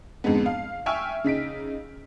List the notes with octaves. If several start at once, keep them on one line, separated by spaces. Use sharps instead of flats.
F2 G#2 D3 G#3 B3
F5
E5 G5 G#5 C#6 E6 F6
C#3 D#4 B6 D7